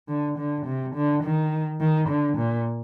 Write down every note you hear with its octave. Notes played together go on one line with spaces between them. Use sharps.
D3
D3
C3
D3
D#3
D#3
D3
A#2